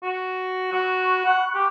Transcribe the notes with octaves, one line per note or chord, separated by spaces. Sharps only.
F#4
F#4 B5 C#6 F#6
F#5
G4